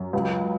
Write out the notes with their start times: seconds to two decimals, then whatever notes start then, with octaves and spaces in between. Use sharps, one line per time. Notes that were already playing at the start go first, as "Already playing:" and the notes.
Already playing: F#2
0.13 C#2